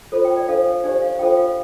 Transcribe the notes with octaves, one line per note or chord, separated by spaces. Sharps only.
F4 A4 C5
G5
D5
D4 A4 C5 F5
D4 G4 C5 D5
F5
D4 F4 A4 C5 G5
F5